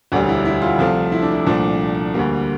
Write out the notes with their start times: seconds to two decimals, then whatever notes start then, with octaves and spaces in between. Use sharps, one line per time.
0.12 E1 D2 D3 G3 D4
0.29 E4
0.45 E4
0.62 F4
0.79 C2 C3 F3 A3 F4
1.12 E4
1.22 D4
1.31 E4
1.46 C2 A#2 F3 A3 D4
2.14 D2 D3 G3 A#3